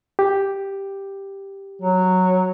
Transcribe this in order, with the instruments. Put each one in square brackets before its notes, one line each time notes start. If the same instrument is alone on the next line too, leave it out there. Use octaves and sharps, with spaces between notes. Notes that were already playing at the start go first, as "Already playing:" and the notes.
[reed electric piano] G4
[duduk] F#3